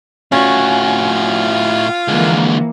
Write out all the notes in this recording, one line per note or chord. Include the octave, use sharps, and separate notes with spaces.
A2 C#4 F4 F#4
D3 E3 F3 G#3 A#3